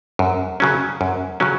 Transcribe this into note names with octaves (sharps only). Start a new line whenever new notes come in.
F#2
C#3 F#3 C#4
F#2
C#3 F#3 C#4